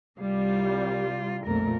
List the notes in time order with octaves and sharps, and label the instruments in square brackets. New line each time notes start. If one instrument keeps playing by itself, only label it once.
[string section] C2 G3 [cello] C3 F4
[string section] B1 F2 A#2 [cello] A3 A#4